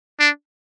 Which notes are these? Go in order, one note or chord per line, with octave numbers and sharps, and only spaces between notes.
D4